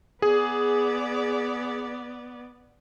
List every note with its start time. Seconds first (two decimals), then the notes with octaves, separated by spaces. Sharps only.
0.22 B3 G#4 D5